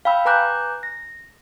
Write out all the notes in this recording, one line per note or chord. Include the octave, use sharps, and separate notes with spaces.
F5 G5 B5 E6
B4 G#5 A#5 D6 F#6 G6
A#6